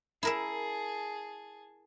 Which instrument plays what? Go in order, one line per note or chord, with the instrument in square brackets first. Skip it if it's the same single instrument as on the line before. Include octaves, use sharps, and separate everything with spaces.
[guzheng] E4 A#4 E5 [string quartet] G#4 A5